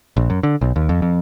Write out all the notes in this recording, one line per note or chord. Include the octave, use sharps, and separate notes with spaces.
A#1
F#2
D3
B1
D#2
F2
F2